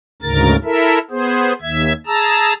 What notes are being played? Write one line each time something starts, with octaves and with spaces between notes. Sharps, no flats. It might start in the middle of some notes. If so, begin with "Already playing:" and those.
D2 G#2 C#3 A#4 A6
E4 A4 A#4 E5
B3 G#4 C5
D#2 E5 G#6
G#4 A5 A#5 E6